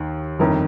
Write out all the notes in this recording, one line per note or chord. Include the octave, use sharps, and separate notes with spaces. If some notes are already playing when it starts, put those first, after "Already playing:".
Already playing: D#2 D#3
G1 F2 D#3 A#4